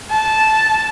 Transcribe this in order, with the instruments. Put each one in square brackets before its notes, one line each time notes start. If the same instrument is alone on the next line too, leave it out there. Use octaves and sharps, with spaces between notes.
[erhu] A5